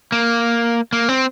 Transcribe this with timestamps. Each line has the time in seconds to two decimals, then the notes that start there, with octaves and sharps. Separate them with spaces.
0.12 A#3
0.93 A#3
1.09 C4